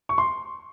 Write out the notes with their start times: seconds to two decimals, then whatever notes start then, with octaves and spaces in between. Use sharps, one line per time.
0.09 C#6
0.18 C6